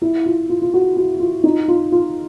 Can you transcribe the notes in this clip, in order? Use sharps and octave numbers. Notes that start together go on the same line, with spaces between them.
E4
F4
F4
F4
F#4
F#4
F4
D#4
F4
F4